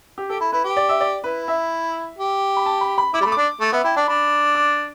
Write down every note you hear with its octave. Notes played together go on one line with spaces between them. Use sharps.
G4
G4 A4
E4
E4 B4
G4
D5
E5
D5
E4 B4
E5
G4
B5
A5
B5
B5
E4 D6
G3 A3 B5
D4 D6
A3
B3 E5
E4 G5
D4 A5
D4 B5
D6